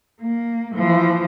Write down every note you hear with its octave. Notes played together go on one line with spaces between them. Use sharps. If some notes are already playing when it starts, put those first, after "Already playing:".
A#3
E3 F3